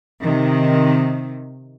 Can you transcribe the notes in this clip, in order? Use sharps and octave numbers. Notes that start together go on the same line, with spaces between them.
C3 D#3